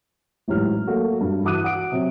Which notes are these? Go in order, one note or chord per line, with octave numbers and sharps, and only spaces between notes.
A1 G#2 F#3 G4 F6
F#3 A3 A#3 F#4
G2
E3 F#4 D6 D#6 F#6 D#7
F#5 D#6 D7
C3 F#3